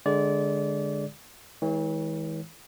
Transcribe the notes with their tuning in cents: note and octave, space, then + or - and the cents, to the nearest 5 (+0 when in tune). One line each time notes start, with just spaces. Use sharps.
D3 +5 G#3 +0 D5 -25
E3 -40 G#3 +5 C#5 +0